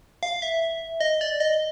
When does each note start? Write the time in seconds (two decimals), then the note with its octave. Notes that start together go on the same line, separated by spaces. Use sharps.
0.23 F5
0.42 E5
1.00 D#5
1.21 D5
1.40 D#5